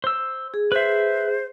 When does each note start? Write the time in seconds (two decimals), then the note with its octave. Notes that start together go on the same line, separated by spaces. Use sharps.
0.04 C5 E6
0.54 G#4
0.72 B4 C5 E5